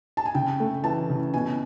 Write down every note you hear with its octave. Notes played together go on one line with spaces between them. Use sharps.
A5
G#5
C#3 G5
A3
E3 A5
C#3
B2 G#5